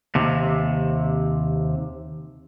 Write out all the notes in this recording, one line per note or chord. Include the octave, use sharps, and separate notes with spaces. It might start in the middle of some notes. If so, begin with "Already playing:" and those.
D#2 C3